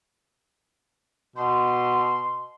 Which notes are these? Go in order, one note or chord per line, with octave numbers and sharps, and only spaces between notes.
B2 C6